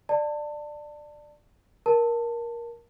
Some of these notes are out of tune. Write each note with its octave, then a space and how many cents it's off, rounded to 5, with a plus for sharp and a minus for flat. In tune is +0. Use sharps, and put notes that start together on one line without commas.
D5 +15 A5 +25
A#4 +15 A5 +15